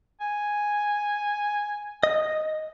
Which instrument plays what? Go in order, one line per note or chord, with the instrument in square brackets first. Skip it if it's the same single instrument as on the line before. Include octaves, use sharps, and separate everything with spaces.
[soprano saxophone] G#5
[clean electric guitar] D#5